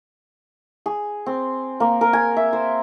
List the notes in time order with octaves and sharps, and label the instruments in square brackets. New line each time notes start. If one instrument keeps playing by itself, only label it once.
[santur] G#4
C4
A#3
A#4
G#5
E5
C5